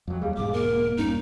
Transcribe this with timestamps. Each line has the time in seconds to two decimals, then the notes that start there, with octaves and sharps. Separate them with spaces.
0.08 F2 F#3
0.22 D#2 G3 G#4 F5
0.36 E1 G#2 D6
0.53 A#3 A#4
0.97 E1 G2 C#4 D#4